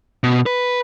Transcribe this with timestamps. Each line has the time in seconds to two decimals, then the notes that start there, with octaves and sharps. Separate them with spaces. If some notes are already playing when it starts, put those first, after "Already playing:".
0.23 B2
0.46 B4